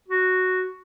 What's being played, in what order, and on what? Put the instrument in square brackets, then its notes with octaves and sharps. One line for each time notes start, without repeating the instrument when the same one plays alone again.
[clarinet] F#4